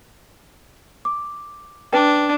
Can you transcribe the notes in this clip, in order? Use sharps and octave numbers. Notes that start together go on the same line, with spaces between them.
D6
D4 B4 D5 G5